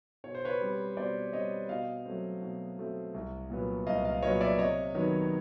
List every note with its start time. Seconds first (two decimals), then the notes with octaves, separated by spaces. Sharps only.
0.24 B2 C#5
0.35 C5
0.45 B4 C#5
0.61 G3 C4
0.97 B2 C5 D5
1.33 G3 C4 C#5 D#5
1.69 B2 D#5 F5
2.06 F#3 A3 C4
2.42 B2
2.78 F#3 A3 C4
3.14 C2
3.50 A#2 F#3 B3
3.86 C2 D#5 F5
4.05 D#5 F5
4.22 A#2 F#3 B3 C#5 D#5
4.41 D5 E5
4.59 C3 C#5 D#5
4.95 D#3 F#3 B3